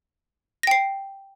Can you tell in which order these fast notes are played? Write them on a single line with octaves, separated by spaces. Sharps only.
A#6 G5 C7